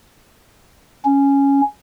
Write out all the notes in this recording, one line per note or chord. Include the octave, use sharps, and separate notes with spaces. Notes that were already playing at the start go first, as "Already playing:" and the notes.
C#4